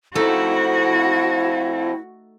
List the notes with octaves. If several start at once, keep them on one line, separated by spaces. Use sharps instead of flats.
F2 A3 C4 D#4 E4 F#4 A4